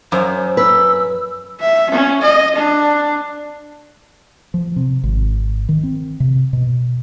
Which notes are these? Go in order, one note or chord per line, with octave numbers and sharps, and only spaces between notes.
F#2 C5
B4 E6
E5
C#4
D#5
D4
F3
C3
G#1
D#3
C4
C3
B2